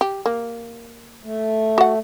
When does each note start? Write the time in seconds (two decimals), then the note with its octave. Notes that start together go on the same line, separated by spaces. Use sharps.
0.01 G4
0.26 A#3
1.23 A3
1.78 F#4 F#5